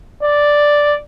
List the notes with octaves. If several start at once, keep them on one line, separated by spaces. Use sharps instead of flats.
D5